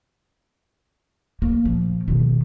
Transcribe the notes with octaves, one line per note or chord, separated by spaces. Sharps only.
A#3
A#2 F3
B2 D#3